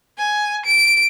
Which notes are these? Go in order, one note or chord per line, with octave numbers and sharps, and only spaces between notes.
G#5
D7